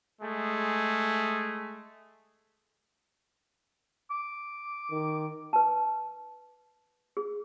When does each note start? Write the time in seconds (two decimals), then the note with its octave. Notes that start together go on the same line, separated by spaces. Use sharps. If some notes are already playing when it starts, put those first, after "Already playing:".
0.20 G#3 A3 G#4
4.11 D6
4.91 D#3
5.53 B4 A5
7.17 G#4